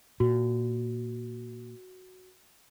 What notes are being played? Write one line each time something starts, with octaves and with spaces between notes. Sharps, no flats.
A#2 F#4